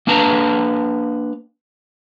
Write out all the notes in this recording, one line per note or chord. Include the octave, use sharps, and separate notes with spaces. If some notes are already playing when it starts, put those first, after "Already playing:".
A#3 D4 B4 A5 A#5